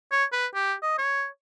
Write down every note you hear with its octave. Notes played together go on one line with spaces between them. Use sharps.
C#5
B4
G4
D#5
C#5